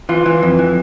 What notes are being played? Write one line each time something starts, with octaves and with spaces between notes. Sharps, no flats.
E3 F4
E3
F2
E3